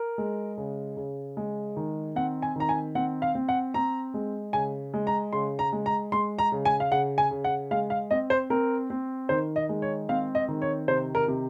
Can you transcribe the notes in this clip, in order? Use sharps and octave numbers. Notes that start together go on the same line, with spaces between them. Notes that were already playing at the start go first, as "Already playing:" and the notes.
Already playing: A#4
G#3
C#3
C#3
G#3
D#3
C4 F#5
G#5
D#3 A#5
G#5
C4 F#5
F5
C4
F#5
C4 A#5
G#3
C#3 G#5
G#3
A#5
C#3 C6
A#5
G#3
A#5
G#3 C6
A#5
C#3
G#5
F5
C#3 F#5
G#5
C#3
F#5
G#3 F5
F5
C4 D#5
C5
C4 A#4
C4
D#3 C5
D#5
G#3
C#5
C4 F5
D#5
D#3
C#5
C3 C5
A#4
C3